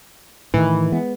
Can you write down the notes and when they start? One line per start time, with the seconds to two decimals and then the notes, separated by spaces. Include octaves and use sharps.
0.54 A2 D#3 E3
0.92 G#3 B3